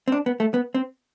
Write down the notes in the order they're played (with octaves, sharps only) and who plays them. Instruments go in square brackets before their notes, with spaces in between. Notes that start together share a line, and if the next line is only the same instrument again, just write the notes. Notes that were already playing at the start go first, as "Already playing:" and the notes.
[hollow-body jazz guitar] C4
D4
B3
A3
B3
C4